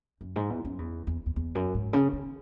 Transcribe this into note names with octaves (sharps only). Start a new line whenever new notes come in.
F#2
G#2
E2
F#2
E2
E2
E2
E2
F#2
G#2
C#3
D#3